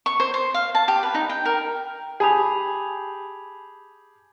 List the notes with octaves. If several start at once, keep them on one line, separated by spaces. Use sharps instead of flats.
C#6
C5
C5
F5
A5
G4
B4
D#4
G5
A#4
G4 G#4 A5 B5 F7